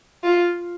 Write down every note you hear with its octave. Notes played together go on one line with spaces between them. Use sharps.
F4